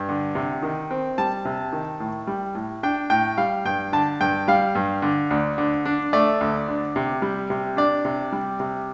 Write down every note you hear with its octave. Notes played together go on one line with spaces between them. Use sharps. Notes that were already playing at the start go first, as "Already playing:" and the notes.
Already playing: G2
D3
C3
D#3
C4
G3 A5
C3
D#3
A2
G3
A2
D4 G5
A2 G5
G3 F5
G2 G5
D3 A5
G2 G5
G3 F5
G2
D3
D2
D3
D4
A3 D5
D2
D3
C3
G3
C3
D4 D5
C3
G3
C3